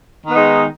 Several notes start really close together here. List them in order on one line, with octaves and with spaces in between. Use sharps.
D#3 B3 D#4 G#3